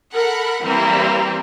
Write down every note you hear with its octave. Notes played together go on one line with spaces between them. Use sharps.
A4 A#4 F#5 B5
E3 G3 A#3 C4 E4